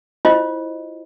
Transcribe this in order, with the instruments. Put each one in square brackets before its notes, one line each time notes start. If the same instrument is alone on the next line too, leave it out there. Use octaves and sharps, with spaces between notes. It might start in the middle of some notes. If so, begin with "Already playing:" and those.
[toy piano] E4 F4 C5 D#5